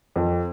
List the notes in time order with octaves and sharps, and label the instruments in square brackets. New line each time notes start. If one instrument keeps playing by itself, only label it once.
[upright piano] F2